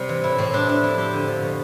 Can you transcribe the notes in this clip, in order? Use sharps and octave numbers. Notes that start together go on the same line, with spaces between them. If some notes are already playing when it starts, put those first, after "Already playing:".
Already playing: C3 G3
E3
A2 E4
A2 C4
G3 D4
B3 D4
F2 E4
C4 G4
D3
F3
B2